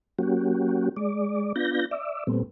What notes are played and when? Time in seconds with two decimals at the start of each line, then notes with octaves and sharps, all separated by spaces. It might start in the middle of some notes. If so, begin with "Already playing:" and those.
0.19 F#3 A#3 C#4 F#4 G4
0.97 G#3 D5
1.56 B3 D4 F4 G6 A#6
1.91 D5 E5
2.27 A#2 G3 A3 B3 C4